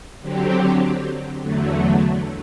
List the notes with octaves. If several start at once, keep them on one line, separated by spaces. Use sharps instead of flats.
D3 F#3 C4 G4
E2 D3 F#3 A3